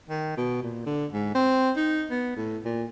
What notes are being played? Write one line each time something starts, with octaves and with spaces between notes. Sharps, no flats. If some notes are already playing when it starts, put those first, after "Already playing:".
D#3
B2
A#2
D3
G#2
C4
D#4
B3
A2
A#2